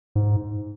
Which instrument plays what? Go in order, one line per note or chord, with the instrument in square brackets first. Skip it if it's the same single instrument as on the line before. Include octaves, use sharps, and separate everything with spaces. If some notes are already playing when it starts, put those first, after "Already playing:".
[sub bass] G#2